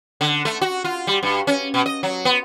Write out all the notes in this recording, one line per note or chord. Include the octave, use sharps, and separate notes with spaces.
D3
A3
F#4
F4
G3
G2
C#4
B2
D#5
F#3
B3